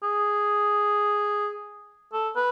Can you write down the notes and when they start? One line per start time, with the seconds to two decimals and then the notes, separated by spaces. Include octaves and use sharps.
0.03 G#4
2.13 A4
2.36 B4